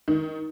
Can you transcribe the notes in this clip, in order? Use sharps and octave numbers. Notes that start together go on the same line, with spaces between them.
D#3